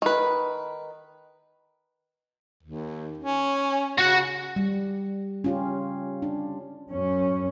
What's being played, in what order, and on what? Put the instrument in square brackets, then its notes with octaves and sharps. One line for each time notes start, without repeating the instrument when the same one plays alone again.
[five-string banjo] D#3 B4
[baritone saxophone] D#2
C#4
[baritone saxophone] C#3 [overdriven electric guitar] F#4 F#5
[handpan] G3
C#4 F4 G4
D4
[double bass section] F#2 C#4